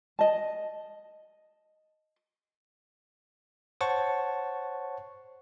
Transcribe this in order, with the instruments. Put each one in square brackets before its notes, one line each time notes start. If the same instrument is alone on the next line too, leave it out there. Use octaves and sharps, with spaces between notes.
[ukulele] D#5 A5
[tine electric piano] C5 C#5 F#5 A5 C#6